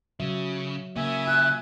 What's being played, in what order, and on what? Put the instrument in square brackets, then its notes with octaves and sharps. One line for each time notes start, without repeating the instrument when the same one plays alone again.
[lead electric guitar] C#3 [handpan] F#3 E5
[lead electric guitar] C#3 [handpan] A#3 [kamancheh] E5 G#5
[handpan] F4 [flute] F#6